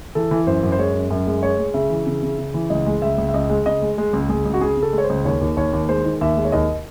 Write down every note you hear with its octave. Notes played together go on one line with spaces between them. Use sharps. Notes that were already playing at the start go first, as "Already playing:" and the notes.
E3 A4
E3
F#2 C5
F#2
C5
G#3 C#5
F#2
F#2
G#3
G#3 C#5
G#3
C#3 E5
E3
C#3
C#3
C#3
E3
C#2 D#5
G#3
C#2 E5
C#2
E5
C#2 D#5
G#3
C#3 D#5
G#3
G#3
C#2
C#2 G#4
C#2
F#4
C#3 G#4
C#3
A4
G#3
C#5
C5
C#2
D#2 C#5
D#2
D#2 C#5
D#2
G#3 C5
D#3
D#2 E5
G#3
C#5
D#2 D#5